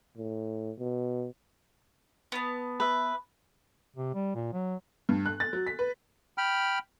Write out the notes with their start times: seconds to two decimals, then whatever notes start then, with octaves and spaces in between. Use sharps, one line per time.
0.17 A2
0.79 B2
2.32 B3 A5
2.80 B4 E5
3.96 C3
4.15 G3
4.35 A#2
4.53 F#3
5.09 G2
5.26 F#6
5.40 A6
5.53 F#3
5.67 B6
5.79 B4
6.38 G5 B5 F6